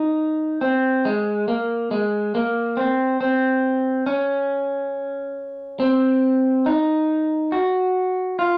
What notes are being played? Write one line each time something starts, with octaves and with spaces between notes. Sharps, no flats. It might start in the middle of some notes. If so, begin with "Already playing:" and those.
Already playing: D#4
C4
G#3
A#3
G#3
A#3
C4
C4
C#4
C4
D#4
F#4
F4